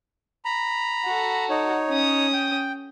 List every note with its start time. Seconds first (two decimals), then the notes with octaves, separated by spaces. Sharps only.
0.45 A#5 B5
1.05 F#4 A4
1.50 D#4 C#5
1.89 C#4 D#6
2.33 G5